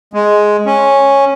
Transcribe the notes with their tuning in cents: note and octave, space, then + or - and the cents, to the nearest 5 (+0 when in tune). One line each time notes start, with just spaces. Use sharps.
G#3 +5
C#4 -5